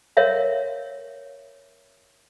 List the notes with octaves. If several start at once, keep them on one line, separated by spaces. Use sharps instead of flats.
A#4 C#5 E5 F5